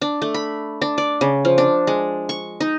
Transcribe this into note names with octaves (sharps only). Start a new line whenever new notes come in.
D4
A3
B5
D4
D5
C#3
F3
D4
G#3
C#6
D#4